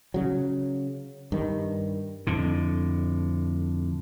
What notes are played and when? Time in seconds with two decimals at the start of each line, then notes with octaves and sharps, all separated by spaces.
0.14 C#3 F#3
1.32 G2 D#3
2.27 F2 A2 D3